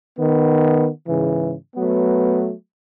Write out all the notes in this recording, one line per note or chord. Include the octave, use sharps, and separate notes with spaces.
D#3 B3
G#2 C#3 E3
F#3 A3 B3